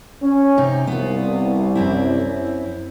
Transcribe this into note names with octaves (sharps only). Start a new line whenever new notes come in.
C#4
C3 D#4
C2 B3 F4
F#2 C4 E4